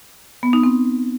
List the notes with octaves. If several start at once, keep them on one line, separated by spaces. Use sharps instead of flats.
B3
D#4
C4